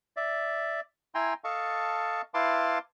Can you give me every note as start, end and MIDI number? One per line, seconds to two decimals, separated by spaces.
0.17 0.80 74
0.17 0.80 76
1.15 1.34 64
1.15 1.34 79
1.15 1.34 80
1.15 1.34 82
1.15 1.34 84
1.44 2.22 69
1.44 2.22 75
1.44 2.22 77
1.44 2.22 81
1.44 2.22 85
2.34 2.79 64
2.34 2.79 71
2.34 2.79 77
2.34 2.79 81
2.34 2.79 84
2.34 2.79 86